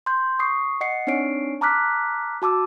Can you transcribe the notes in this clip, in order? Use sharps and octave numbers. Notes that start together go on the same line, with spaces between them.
C6 G6
C#6 D#6 C7
D#5 F#5 C7 C#7
C4 D4 D#4 C#5 C7 D7
A5 A#5 D6 F6 F#6 B6
F#4 A5 D6 E6